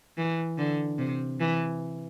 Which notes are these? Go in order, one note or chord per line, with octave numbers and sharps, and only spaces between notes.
E3
D3
C3
E3